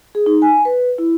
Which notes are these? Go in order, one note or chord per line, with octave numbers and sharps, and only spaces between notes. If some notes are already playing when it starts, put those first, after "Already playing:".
G#4
D#4
G#5
B4
E4